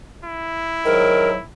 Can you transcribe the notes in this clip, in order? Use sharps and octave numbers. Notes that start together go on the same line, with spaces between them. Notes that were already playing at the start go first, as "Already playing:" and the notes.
E4
G#2 D#3 F#3 A#4